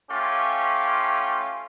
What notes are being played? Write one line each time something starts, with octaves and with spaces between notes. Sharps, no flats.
A3 C#4 F4 G4